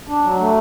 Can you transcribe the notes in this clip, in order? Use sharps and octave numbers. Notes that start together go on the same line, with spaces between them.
D4
F#3
A3